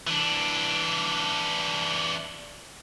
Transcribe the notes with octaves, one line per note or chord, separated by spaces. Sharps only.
E3 D4